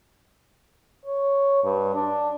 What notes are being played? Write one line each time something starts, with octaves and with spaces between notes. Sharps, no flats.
C#5
G2
D4